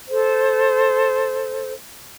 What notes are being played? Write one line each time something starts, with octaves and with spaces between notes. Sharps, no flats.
A4 C5